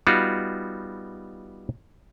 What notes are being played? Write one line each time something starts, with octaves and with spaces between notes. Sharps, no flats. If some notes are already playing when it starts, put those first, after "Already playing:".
G3 B3 D#4 F4 F#4